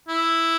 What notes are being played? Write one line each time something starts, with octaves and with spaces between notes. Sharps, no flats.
E4